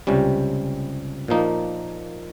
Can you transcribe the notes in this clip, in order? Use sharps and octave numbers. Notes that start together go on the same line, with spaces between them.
C#2 C3 G3 C#4
A#2 F3 A#3 D#4